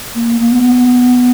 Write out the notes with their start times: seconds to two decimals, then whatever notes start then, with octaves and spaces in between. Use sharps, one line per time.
0.15 A#3
0.40 A#3
0.52 B3